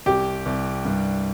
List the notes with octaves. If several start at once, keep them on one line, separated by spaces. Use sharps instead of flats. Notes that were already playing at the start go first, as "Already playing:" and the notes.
C2 G4
C2
G2